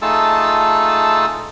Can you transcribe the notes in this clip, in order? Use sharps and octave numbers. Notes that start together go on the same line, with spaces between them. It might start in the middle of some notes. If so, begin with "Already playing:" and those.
A3 D#4 F4 G#4 A5 E6